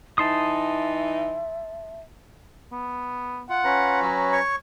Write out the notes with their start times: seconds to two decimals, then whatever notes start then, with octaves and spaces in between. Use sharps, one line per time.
0.18 E3 D#4 E5 A5 C6 D#6
2.72 B3
3.49 F4 F#5
3.65 C#4 B4 A#5
4.02 F#3
4.32 C#5 C#6